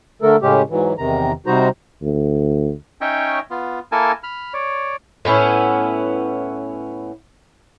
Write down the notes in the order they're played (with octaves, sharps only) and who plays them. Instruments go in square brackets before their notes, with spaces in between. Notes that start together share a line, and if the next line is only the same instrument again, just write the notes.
[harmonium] D3 A3 A4 A#4
A2 C#3 G#3 C#4 G4
G#2 E3 F#3
E2 C3 D#3 A#5
C3 G3 D#4 F#4 C5 A#5
[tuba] D2
[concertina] C#4 D#4 C#5 D#5 E5 G5
B3 F4
A#3 E4 A4 A#4 G#5 A5
B5 F6
C#5 D5
[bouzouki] A2 B3 C#4 E4